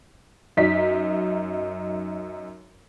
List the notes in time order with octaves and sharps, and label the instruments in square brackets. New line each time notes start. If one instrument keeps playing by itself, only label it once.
[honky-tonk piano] F#2 D#4 B6